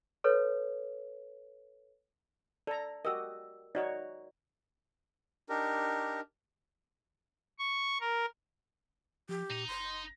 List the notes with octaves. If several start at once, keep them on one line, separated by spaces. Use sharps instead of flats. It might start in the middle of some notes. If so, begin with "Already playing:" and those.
A4 B4 C#5
A4 D5 A#5
F#4 G4 A#4 D#5 E6
D#4 F#4 C#5 D5
D4 D#4 G4 A#4
C#6
A#4
F3 G4
A#2 D#4
F#1 C6